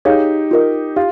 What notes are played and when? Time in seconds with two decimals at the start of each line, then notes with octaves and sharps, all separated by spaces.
0.05 D#4 G4 G#4 C#5 F5
0.51 F4 A#4 D#5
0.96 F4 G4